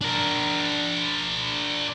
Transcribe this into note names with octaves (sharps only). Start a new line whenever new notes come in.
D4 A#4